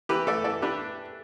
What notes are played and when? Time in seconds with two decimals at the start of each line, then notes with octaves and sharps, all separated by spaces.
0.09 E3 G4 B4
0.27 A3 A4 D5
0.44 E3 A4 D5
0.62 D4 G4 B4